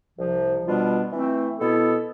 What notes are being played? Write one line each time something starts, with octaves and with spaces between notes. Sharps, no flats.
C2 C3 F3
B2 G3 B3 D4 F4
E3 A3 C4
B2 B3 E4 A4